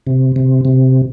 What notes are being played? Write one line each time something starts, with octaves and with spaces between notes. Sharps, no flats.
C3
C3
C3